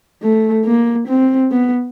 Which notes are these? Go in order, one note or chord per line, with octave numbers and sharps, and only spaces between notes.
A3
A#3
C4
B3